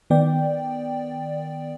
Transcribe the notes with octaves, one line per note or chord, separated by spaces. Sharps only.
D#3 B3 D5 G5